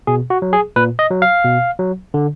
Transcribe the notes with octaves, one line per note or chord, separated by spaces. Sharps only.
B2 G#4
F#4
F#3
G#4
A#2 B4
D#5
F#3
F5
B2
F#3
D3